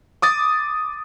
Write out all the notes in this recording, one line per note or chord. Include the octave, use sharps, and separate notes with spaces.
D6 D#6 A6